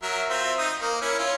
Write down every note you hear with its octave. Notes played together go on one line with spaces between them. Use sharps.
F#3 A#4 E5
C4 F4 E5
D#4 D#6
A#3
C#4 E4
C#4 F4